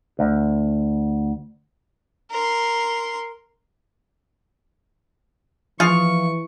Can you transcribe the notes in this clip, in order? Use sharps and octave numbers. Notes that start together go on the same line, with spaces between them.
D2
A#4 C6
E3 F3 F4 G#4 F5 C#6